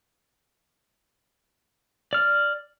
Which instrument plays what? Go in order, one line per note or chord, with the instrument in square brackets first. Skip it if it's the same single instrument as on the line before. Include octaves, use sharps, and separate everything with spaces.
[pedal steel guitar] D5 F6